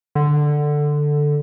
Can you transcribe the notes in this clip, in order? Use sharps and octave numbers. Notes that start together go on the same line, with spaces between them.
D3